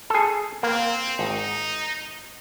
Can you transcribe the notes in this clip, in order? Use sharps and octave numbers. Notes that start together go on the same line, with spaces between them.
G#4 A4
A#3 C4
G#1 D#4